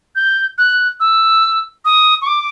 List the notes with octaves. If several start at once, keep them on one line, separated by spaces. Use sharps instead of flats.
G6
F#6
E6
D#6
C#6
D6